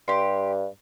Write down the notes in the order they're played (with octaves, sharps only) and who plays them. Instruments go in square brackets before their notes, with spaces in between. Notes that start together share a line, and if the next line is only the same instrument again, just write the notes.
[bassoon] G2 [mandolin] G4 C6